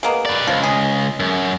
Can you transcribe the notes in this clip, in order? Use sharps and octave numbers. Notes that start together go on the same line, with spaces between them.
G#3 A#3 B3
B4 D5
C#2 F3
G#4
F#2